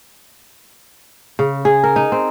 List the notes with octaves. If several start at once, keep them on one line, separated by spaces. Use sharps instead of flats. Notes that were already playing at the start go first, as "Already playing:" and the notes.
C#3
G#4
A#4
D#4
C4